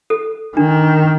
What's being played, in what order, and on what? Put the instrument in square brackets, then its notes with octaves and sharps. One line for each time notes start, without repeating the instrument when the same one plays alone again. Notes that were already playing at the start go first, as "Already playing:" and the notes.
[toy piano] A4
[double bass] D#3 [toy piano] D4